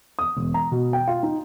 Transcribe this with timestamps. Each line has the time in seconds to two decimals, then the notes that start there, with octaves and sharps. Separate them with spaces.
0.19 D#6
0.37 E1
0.54 A#5
0.72 B2
0.93 G5
1.07 F4
1.23 D#4